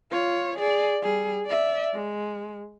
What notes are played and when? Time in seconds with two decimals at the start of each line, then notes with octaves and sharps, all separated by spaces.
0.12 F4 C#5
0.58 G#4 D5
1.02 G3 G#4
1.46 D5 E5
1.93 G#3